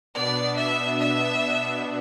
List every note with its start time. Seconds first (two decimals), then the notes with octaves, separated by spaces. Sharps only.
0.14 B2 B3 D4 D5
0.57 E5
1.00 E5